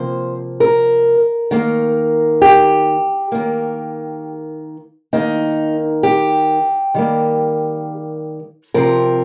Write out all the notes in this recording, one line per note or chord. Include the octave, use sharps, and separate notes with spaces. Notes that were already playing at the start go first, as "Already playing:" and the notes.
Already playing: C3 F3 A#3 C5
A#4
D#3 A#3
G4
D#3 A#3
D#3 A#3 D#4
G4
D#3 G3 A#3
C3 F3 C4 A#4